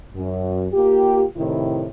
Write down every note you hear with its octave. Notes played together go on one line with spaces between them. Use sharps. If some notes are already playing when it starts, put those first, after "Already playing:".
F#2
A#3 F4 G4
A2 C3 D#3 E4